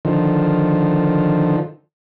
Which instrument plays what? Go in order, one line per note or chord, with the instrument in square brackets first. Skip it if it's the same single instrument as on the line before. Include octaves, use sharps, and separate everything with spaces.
[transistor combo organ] D3 D#3 F3